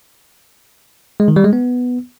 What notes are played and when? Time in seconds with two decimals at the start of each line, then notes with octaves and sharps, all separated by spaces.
1.20 G#3
1.28 D#3
1.36 G3
1.45 G#3
1.53 B3